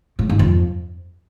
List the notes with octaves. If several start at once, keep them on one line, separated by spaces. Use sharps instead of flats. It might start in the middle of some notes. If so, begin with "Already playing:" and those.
A2
G#2
F2